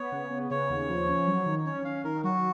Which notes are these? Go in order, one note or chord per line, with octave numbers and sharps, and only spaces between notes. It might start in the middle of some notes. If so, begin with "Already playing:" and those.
Already playing: B3 C#5
C#3
B3
C#3 C#5
D#2
F3
C#4
F#3
D#3
C#4 C#5
C#4 F5
D#3 A#4
F#3 F#4